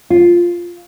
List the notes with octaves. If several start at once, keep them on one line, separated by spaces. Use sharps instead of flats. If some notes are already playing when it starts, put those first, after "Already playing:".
F4